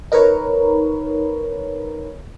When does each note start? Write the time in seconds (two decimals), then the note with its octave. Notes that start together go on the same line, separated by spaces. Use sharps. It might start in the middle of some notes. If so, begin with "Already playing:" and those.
0.12 D#4 A#4 B4 C#5